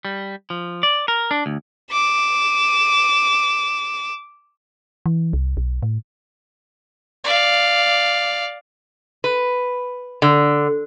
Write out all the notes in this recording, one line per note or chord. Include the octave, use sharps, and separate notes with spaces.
G3
F3
D5
A#4
D4
D2
D6 E7
E3
C2
B1
A2
D5 F5
B4
D3